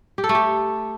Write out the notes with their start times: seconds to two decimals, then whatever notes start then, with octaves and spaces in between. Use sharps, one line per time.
0.18 G4
0.24 A4
0.29 A3
0.35 G4